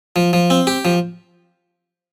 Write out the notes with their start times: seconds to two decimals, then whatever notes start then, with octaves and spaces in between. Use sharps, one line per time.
0.16 F3
0.33 F3
0.50 C4
0.67 G4
0.85 F3